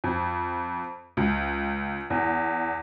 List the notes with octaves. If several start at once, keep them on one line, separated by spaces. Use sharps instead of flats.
F2
C#2
E2